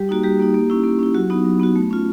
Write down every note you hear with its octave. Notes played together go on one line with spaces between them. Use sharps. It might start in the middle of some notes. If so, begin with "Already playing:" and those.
Already playing: G3 G4
A#3 D#4 F#4
G3 G4
A#3 D#4
A#3
C#4 E4
A#3
C#4 E4
F#3 F#4
B3 D#4 F#4
F#3
B3 D#4 F#4
A3
C#4 F4